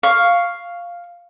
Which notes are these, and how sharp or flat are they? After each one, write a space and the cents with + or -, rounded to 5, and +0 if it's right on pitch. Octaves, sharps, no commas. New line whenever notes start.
F5 +0 C#6 +10